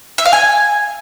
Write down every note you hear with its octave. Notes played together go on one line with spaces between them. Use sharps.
E5
F5
G#5